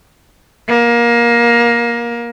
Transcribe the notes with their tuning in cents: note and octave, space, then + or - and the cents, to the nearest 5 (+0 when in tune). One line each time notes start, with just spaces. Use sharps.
A#3 +20